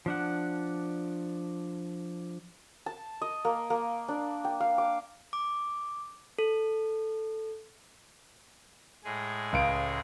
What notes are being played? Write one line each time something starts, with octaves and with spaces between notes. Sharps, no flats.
F3 D4 F#5
A5
D#5
A#3
A#3
D4
G5
F5
D6
D6
A4
A2 G#3 G#4
C#2 F5 D7